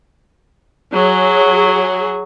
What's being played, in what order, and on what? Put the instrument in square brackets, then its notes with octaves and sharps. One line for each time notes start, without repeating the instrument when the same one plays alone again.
[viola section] F#3 G#4